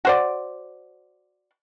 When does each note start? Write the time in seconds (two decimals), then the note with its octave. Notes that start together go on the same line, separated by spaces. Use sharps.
0.05 F#4 C5 D5